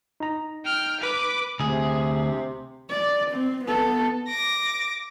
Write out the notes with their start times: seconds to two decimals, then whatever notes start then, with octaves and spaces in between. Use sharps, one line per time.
0.20 D#4 A#5
0.65 G5 F6
1.00 B4 D6
1.60 D2 C3 G#4
2.90 D5
3.31 C4
3.65 B3 A4
4.28 D6 A#6